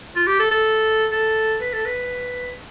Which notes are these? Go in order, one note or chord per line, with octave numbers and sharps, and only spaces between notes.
F4
G4
A4
A4
A4
B4
A4
B4